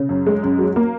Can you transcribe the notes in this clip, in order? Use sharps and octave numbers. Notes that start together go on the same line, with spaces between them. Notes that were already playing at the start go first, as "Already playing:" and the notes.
Already playing: C#3
F#2
G#3
F#2
F#3
A#3